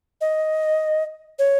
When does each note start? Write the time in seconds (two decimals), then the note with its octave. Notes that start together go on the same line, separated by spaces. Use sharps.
0.21 D#5
1.39 C#5